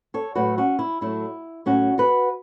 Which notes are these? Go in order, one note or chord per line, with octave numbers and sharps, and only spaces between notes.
A4 C#5
A2 F#3 A3 F#4 B4
C#4 F#4
E4
A2 F#3 A3 E4
A2 F#3 A3 C#4 F#4
F#4 B4